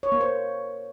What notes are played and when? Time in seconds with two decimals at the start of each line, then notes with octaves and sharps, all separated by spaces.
0.03 C#5
0.12 A#3
0.21 C5